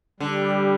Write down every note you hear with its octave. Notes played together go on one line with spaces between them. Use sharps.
D3 G3